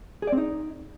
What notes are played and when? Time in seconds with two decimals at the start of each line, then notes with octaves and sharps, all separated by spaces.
0.22 G#4
0.27 D5
0.32 C4
0.37 D#4